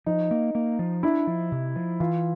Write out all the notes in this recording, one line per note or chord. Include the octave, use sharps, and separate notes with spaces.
F3 D#4
A#3
A#3
F3
D4 E4
F3
C3
F3
E3 F4